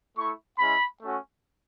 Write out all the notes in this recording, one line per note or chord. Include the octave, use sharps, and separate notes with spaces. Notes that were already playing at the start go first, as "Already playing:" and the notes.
A3 E4 C#6
G#3 C#4 E4 B5
A3 C#4 F#4